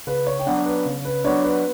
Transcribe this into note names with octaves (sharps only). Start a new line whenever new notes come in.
C#3 B4
C#5
G5
F#3 B3 D4 F#5
B4
C#3
B4
F#3 B3 D4 C#5
B4